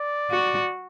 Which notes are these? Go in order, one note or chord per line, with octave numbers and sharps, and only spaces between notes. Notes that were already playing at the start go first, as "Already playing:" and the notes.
Already playing: D5
F#4